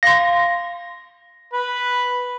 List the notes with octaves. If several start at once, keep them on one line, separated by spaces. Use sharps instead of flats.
F5 C6 A#6
B4 B5